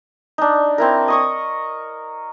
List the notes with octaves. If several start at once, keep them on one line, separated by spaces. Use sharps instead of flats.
D4 D#4
C4 E4 A#4
D#5 C#6 D#6